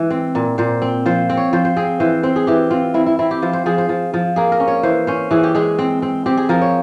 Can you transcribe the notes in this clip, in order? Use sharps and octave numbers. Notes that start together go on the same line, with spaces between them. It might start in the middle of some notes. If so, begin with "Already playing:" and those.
Already playing: E3 G#3
C4
A#2
A#2 C5
C4
F3 C5
C4
C#5
F3 C5
C5
C4 G#4
E3 C5
C4 C5
G#4
E3 G4
C4 F4
C4 E4
E4
C4 E4
G4
F3 C5
C5
F3 G#4
C5
F3
F3
A#3 G#4
A#4
C#4
C#5
E3 C5
C#4 C5
E3 G#4
G4
G#3 G#4
C4
C4
C4 G4
G#4
F3 A#4
C#5